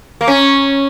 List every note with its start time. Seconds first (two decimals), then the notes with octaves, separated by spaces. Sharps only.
0.21 A#3
0.28 C#4